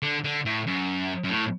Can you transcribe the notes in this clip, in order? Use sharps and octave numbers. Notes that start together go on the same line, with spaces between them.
D3
D3
A2
F#2
F#2
A2